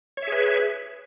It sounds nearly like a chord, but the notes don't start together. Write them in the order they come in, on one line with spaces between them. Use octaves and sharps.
C#5 E5 G#4 B4